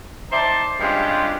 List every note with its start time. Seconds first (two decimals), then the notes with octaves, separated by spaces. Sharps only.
0.32 D#4 C5 D5 E5 A5
0.80 G2 G#3 C4 C#4 F4 G4